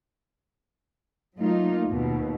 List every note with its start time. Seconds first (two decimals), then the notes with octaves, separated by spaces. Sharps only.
1.38 F#3 A3 A#3 D#4 F4
1.85 D#2 B2